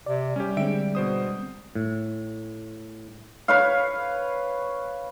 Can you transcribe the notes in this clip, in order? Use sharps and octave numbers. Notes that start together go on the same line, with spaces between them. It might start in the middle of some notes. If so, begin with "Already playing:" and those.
C3 D5
G3 C#4 G4
D3 G#3 C4 E5 G5 D7
B2 C5 D#6
A2
B4 C#5 F5